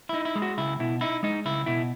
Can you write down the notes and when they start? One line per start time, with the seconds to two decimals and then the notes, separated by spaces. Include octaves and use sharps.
0.09 D#4 E4
0.25 E4
0.35 G#3
0.42 F#4
0.58 C#2 E4
0.80 B2 E4
1.01 D#4 E4
1.23 G#3 D#4
1.45 C#2 E4
1.66 B2 E4